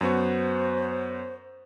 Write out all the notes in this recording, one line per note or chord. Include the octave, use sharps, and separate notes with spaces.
F#2 B3 F#4 C5